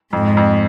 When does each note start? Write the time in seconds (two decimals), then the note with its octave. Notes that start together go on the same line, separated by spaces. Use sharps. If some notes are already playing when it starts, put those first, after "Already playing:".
0.13 F2 G#2
0.37 F2